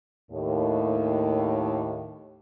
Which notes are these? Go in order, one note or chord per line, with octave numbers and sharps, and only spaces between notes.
D#2 A2